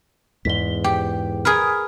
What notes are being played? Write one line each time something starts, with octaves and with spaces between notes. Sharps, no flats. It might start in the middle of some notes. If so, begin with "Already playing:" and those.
E2 G#2 B6 G7
G4 G5
G#4 A#4 B4 F6